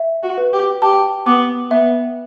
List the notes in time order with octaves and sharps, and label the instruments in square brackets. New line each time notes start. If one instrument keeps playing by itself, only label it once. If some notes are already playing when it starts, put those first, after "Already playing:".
Already playing: [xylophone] E5
[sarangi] F#4
[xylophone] B4
[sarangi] G4
[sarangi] G4 [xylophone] A5
[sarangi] B3 [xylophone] D6
[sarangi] B3 [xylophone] E5